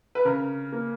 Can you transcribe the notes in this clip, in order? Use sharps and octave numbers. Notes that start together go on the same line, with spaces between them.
B4
C#3 A#4
A#3